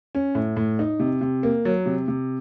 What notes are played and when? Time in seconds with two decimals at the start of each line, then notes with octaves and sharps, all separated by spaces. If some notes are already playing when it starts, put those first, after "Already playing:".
0.15 C#4
0.35 A2
0.57 A2
0.79 D#4
1.00 C3
1.21 C3
1.43 A#3
1.65 F#3
1.86 C3
2.08 C3